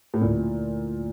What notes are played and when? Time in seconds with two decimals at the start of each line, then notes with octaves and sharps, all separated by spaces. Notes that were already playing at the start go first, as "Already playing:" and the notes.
0.14 A2
0.21 D2 A#2 D3 A3 E4